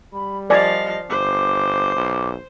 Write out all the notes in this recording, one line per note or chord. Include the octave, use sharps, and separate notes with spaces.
G3 B5
F3 A#4 D5 D#5 F5 G#5
G1 C5 D6
B1